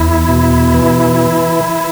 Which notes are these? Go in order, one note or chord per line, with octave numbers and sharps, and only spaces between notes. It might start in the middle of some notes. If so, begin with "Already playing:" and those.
Already playing: E2 E4
B2
E3